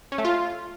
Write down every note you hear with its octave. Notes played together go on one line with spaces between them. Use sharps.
C#4
A3
F4